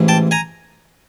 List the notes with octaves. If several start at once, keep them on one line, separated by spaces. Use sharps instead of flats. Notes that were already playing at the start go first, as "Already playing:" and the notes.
Already playing: A1 G#2 E3
G5 A5
G#5 A#5